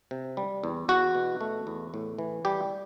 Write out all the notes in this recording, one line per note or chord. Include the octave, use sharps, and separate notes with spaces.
C3
G3
E2
E2 F#4
B2
A3
E2
A2
E3
G3 G4